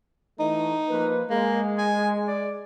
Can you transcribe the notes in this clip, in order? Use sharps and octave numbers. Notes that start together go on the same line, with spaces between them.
E3 A3 D#4
F3 A#3 B4
G#3 A#3
G#5
D5